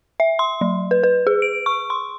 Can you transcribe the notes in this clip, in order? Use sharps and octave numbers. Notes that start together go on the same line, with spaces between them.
E5
C6
F#3
B4
B4
G#4
D7
C#6
C6